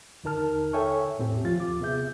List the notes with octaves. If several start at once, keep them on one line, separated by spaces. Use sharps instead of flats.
D#2 D3 D#4 A#4 A5 F6
A4 C#5 E5 G5 G#5 C#6
E2 A2 C4 G4
D#2 F3 F4 A6
D6
C3 B3 G#4 E5 G6